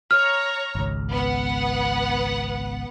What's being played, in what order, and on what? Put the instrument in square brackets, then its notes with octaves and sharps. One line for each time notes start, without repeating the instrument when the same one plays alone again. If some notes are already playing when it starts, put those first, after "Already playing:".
[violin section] C#5 A#5 [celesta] F6
[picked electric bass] G#1 C#2
[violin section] B3 F#5